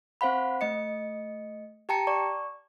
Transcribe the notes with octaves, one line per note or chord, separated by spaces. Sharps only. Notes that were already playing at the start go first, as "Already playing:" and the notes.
C4 C5 F5 F#5 B5
A3 D#5 C#7
G4 G5 A5 A#5 C#7
D5 C#6